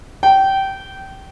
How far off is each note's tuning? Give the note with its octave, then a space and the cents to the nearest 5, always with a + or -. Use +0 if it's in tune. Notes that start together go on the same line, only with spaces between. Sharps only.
G5 -20